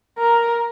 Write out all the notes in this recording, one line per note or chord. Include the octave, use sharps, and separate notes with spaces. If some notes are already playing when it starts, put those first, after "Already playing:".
A#4